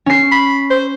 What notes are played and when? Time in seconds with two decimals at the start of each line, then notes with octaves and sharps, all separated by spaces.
0.06 C#4 C7
0.32 B5
0.70 C5